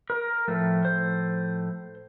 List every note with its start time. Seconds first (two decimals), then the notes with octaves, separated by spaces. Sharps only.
0.10 A#4
0.48 A2 F3 A3
0.85 C5